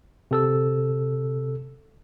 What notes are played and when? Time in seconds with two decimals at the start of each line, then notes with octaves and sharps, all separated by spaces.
0.31 C3 A4 E6